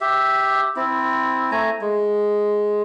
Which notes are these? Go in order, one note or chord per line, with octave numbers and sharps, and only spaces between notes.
G4 E5
C4 E4
A3 G#5 A#5
G#3